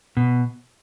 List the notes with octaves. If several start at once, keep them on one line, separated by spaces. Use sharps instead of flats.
B2